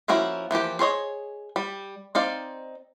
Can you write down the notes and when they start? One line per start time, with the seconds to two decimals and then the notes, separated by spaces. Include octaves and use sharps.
0.08 F3 A#3 C#4 E4 F#4
0.51 E3 F3 A#3 G4
0.79 G#4 C5 C#5 D#5
1.56 G3
2.15 C4 D#4 D5 F5